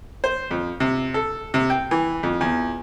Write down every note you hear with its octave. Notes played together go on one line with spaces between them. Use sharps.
C5
F2
C3
A4
C3
G5
E3
F2
E2